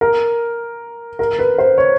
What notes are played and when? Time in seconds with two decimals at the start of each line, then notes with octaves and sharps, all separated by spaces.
0.01 A#4
1.19 A#4
1.39 B4
1.58 C5
1.78 C#5